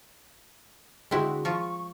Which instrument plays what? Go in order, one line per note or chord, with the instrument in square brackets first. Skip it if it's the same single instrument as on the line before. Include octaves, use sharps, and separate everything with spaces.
[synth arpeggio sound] D3 F#4 [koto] G#3 C4 E4
[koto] F3 F4 [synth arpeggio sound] C#6